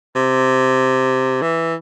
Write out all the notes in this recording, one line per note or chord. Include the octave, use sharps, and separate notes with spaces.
C3
E3